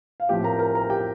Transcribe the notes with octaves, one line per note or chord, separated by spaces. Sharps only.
F5
A2 F3 C4 G4 G5
A#4 A#5
A#4 A#5
A#4 A#5
G4 G5